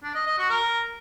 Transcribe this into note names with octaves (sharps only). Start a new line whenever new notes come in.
D4
D#5
D#5
F#4
A#4